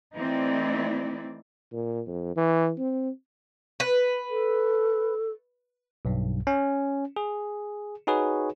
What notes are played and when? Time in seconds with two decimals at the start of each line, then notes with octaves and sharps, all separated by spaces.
0.17 E3 A3 C4 D#4 E4 D5
1.73 A#2
2.07 F2
2.36 E3
2.79 C4
3.80 B4
4.30 A4
6.05 B1 G2
6.47 C#4
7.16 G#4
8.07 D#4 F#4 G#4 B4 C#5